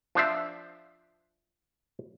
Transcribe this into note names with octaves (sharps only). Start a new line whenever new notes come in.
F3 D4 C5 E5